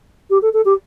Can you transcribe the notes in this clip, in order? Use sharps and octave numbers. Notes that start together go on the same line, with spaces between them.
G4
A4
A4
G4